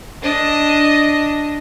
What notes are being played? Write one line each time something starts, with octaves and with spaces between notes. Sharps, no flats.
D4 D#5